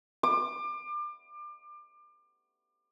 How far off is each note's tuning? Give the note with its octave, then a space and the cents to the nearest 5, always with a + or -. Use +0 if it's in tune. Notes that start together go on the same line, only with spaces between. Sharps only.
D6 +30